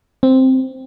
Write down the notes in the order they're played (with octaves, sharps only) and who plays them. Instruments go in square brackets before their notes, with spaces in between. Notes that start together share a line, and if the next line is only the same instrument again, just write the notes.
[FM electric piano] C4